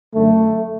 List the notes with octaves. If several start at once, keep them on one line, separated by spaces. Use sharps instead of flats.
F#2 D3 F#3 A3